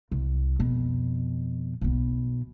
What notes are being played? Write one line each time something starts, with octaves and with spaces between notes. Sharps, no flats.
C2
F2 B2
B1 B2